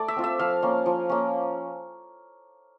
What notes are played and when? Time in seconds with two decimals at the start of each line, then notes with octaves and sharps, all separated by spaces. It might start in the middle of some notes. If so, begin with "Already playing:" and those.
Already playing: A3 D5
0.08 E5
0.16 C4 F4
0.24 E5
0.39 F3 F5
0.62 A#3 C#4
0.86 F3
1.09 A#3 C#4